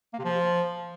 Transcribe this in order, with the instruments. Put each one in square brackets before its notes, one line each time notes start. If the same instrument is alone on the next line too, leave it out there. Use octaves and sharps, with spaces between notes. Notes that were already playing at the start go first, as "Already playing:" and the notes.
[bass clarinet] A#3
C3
F3